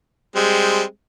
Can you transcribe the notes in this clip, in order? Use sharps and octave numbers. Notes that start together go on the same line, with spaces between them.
G3 G#3 C4